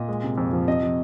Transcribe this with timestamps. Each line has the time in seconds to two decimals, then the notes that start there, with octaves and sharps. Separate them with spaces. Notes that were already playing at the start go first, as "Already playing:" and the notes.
Already playing: A#2 D#5
0.08 G#3
0.23 C3
0.38 F2
0.53 F3
0.68 C3 D#5
0.82 F3